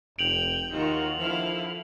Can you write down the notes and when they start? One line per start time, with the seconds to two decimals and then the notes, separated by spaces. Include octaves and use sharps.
0.19 F1 G5 D7 F7 F#7
0.70 D#2 D#3 F4 F#4
1.18 D3 F3 E4 F5